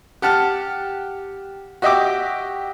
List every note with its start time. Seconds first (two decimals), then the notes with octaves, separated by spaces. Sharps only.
0.22 G4 F#5 A5 F6
1.82 F#4 G4 D#5 E5 G5 D6